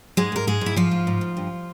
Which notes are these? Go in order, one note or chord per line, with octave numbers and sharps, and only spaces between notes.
G#2 G#3 G#4
G#2 A#4
G#2 G#3 G#4
G#2 E4
G#2 F3 F4
G#2
G#2
G#2
G2